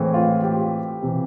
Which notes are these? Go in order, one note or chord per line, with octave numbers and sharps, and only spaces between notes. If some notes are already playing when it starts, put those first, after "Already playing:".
Already playing: A2 E3 G#3 C4
F4
G4
C3 E3